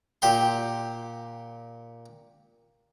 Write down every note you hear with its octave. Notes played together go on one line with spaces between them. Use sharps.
A#2 G4 G5 C6